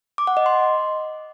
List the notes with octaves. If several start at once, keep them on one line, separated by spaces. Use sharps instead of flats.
D6
F#5
D#5
C6